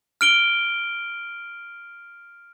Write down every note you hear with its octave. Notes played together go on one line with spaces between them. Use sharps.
F6 D7 G7